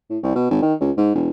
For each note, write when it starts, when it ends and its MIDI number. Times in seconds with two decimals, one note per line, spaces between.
0.10 0.18 45
0.23 0.34 36
0.36 0.47 47
0.51 0.61 32
0.62 0.74 51
0.81 0.91 37
0.97 1.13 44
1.15 1.30 28